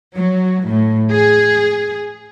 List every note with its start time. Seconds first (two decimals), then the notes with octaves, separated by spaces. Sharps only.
0.18 F#3
0.66 A2
1.12 G#4